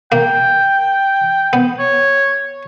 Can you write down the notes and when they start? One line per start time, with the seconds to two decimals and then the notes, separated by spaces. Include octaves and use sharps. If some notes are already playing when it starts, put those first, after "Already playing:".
0.12 A#3 G5
1.53 B3
1.79 C#5